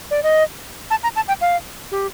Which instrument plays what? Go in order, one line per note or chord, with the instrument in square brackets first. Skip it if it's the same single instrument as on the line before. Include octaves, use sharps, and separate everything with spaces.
[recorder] D5
D#5
A5
A#5
A5
G5
F5
G4